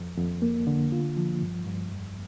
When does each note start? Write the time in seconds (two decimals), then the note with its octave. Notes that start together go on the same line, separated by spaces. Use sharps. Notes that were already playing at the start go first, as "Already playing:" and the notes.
Already playing: F2
0.18 F2
0.42 A#3
0.67 D3
0.92 F4
1.17 F3
1.42 G2
1.67 G2
1.92 F2